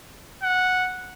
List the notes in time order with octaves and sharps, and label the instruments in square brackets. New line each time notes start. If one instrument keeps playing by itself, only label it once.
[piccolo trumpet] F#5